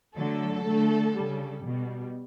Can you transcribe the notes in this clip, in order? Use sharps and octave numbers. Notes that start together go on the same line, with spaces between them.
D3 F#3 A3 A4
D3 A3
C#3 G3
B2 G3